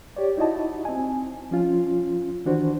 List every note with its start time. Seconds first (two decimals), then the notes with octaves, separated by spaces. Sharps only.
0.16 G4 C#5 D5
0.37 D#4 E4 F#4 D#5 A5
0.85 C4 G#5
1.51 F3 C#4 F4
2.45 D#3 E3 D4 F#4 C5